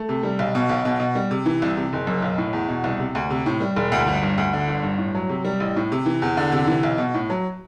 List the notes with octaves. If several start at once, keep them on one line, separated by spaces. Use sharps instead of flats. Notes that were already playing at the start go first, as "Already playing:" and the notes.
Already playing: A3
C3
G3
B1
B2
B1
B2
B2
G3
C3
E3
C2
C3
F#1
F#2
B1
A2
E2
B2
C2
C3
D2
C3
A2
G3
E1
D2
G1
G2
D2
D3
G1
G2
A2
F#3
C3
G3
A1
A2
C3
E3
E2
D3
C3
E3
B1
B2
A2
F#3